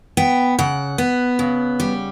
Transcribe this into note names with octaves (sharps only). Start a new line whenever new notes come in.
B3 G5
C#3 F#5
B3
C#3
G3